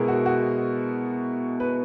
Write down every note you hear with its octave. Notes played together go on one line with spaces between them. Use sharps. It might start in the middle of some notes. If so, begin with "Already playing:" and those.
Already playing: B2 G#3 B3 E4 G#4 A#4
F#4
F#4
B4